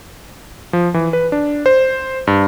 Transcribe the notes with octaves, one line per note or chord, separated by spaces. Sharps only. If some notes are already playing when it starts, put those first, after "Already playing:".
F3
E3
B4
D4
C5
G2